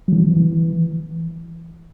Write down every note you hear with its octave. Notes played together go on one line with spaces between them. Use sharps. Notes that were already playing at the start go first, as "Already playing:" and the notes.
F#3
E3
E3